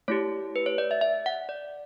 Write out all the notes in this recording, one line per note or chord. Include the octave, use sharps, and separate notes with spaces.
A3 E4 G4 C#5
B4
C#5
D5
E5
E5
F#5
D5